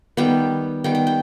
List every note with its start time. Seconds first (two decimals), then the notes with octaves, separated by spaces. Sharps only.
0.17 D#3 G3 B3 G5
0.84 D#3 G3 B3 G5
0.95 G5
1.07 G5